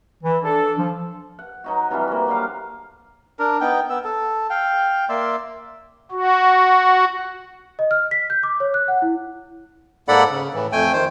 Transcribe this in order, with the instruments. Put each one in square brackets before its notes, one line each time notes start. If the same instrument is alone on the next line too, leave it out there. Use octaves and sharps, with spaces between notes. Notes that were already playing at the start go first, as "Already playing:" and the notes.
[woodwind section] E3
D4 A4
F3
[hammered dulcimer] F#5
F#3 D#4 F#4
C3 E3 F3 G3
A#3 F#4
D3 F#3 G3 F5
[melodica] D4 A#4
B3 D#4 G5
B3 E6
A4
F5 G5
A#3 D5 E5 C6
[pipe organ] F#4
[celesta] D#5
F6
B6
G6
D6
C#5
F#6
F#5
E4
[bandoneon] G#2 A#3 A4 D5 F#5 B5
C#3
A2 E3
F2 A3 G5 G#5
D#3 C5